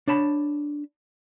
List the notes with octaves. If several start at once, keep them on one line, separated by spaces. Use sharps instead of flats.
D4 C#5 A5 B5